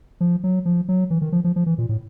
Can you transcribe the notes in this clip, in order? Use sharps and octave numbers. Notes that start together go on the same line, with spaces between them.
F3
F#3
F3
F#3
E3
D#3
F3
F3
F3
E3
A#2
A2